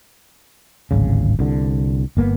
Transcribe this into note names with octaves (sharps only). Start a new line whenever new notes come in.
D1 G#1 C#3
C2 D3
G1 A#3 B3